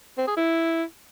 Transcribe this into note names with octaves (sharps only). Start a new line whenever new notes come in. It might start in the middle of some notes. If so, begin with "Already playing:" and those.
C4
G#4
E4